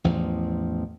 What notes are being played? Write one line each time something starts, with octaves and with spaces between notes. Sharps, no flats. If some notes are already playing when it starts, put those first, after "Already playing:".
A1 E2 F3